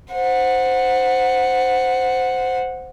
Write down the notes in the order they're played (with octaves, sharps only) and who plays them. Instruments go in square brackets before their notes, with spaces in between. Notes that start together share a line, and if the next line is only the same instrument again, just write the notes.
[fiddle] C5 F#5